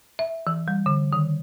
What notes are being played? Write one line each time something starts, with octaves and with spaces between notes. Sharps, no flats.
E5
E3
G3
D3
D#3